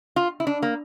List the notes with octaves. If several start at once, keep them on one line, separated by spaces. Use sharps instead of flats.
F4
E4
D4
A#3